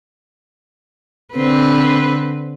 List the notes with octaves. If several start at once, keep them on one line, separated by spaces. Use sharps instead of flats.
D3 C4 B4